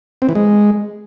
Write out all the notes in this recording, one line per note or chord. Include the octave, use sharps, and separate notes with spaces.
C4
E3
G#3